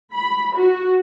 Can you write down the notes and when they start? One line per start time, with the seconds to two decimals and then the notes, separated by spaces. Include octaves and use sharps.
0.14 B5
0.55 F#4